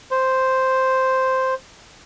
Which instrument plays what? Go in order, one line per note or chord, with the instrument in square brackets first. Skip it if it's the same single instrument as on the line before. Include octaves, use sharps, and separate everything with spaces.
[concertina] C5